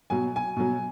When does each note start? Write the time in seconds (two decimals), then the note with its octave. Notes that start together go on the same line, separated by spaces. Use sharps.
0.10 B2 F#3 G#5
0.36 G#5
0.56 B2 F#3